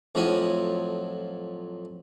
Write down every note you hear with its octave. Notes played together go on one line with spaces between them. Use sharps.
F2 A2 F3 F#3 G#5